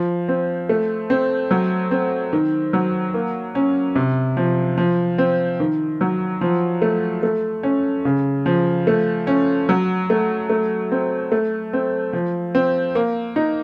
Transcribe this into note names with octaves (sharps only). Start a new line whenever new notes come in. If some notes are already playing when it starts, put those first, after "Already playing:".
Already playing: F3
C4
A3
C4
F#3
C4
D#3
F#3
A#3
C#4
C3
F3
F3
C4
D#3
F#3
F3
A3
A3
C#4
C#3
F3
A3
C#4
F#3
A3
A3
C4
A3
C4
F3
C4
A#3
D#4